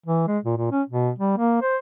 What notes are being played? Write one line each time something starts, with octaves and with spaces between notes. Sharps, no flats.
E3
G#3
A#2
A#2
C#4
B2
G3
A#3
C5